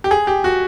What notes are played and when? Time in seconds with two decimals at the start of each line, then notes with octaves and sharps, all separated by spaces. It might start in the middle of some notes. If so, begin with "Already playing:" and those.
0.04 G4
0.11 G#4
0.27 G4
0.44 F#4